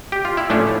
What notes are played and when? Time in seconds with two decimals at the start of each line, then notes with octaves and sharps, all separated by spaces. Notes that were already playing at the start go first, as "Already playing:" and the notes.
0.12 G4
0.25 F4
0.37 E4
0.50 A2 F3 A3 C#4 D4